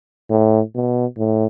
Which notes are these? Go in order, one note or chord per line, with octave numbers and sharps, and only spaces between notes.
A2
B2
A2